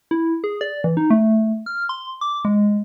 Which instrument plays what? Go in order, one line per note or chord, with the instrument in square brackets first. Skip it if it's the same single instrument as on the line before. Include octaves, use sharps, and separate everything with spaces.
[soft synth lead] E4
G#4
D5
E3
D#4
A3
F6
C6
D6
G#3